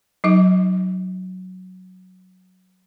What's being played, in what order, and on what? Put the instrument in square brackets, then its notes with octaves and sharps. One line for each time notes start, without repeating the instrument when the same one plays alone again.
[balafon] F#3 D#4 D#5